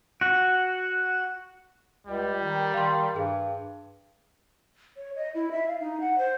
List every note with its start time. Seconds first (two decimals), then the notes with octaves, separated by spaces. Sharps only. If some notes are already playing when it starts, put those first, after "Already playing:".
0.21 F#4
2.07 C#2 G3
2.42 D#3
2.74 D#3 F5 C6
3.16 G2 G#4
4.97 C#5
5.16 D#5
5.34 E4
5.51 E5
5.68 F5
5.80 D#4
6.00 F#5
6.18 C5